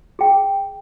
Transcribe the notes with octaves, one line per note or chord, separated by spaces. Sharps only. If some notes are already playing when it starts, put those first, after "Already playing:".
G#4 G5